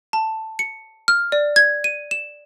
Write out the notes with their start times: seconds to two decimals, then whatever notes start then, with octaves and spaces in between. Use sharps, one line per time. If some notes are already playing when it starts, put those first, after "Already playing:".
0.13 A5
0.59 C#7
1.08 F6
1.32 D5
1.56 G#6
1.84 D#7
2.11 E7